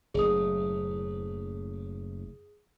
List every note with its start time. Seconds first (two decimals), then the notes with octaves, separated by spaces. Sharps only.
0.14 F#1 A2 G#4 D#6